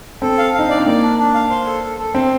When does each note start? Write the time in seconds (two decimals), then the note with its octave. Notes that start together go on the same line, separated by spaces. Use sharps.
0.22 C4 A4
0.38 F5
0.54 D#4 F5
0.68 D4 D5
0.78 C4
0.86 A#3 D5
1.03 D4
1.18 D4
1.34 F5
1.50 C5
1.67 A4
1.83 A4
1.99 A4
2.15 C4 C5